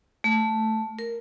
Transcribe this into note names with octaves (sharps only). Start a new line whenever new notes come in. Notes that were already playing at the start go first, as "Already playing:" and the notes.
A3
A#4